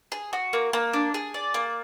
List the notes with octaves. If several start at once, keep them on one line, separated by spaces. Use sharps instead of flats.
G#4
F#4
A#3
A#3
D4
G#4
D5
A#3